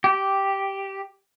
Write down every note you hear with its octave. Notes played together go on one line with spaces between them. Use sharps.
G4